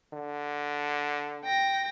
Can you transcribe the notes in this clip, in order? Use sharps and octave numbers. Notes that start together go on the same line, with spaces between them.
D3
G5 A#6